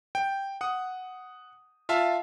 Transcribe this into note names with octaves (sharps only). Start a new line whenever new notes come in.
G5
F#5 D#6
F4 E5 F5 A5